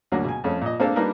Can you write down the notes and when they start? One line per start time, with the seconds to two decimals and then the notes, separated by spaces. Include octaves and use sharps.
0.12 D2 F#3 A#3 D4
0.25 B2 G#5
0.44 F2 A3 C#4
0.61 A#2 D#5
0.80 A#3 C4 D4 A4 F5
0.96 G3 A#3 D4 D#4 A#4 B4